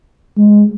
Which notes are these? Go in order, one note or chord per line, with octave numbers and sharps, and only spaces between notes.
G#3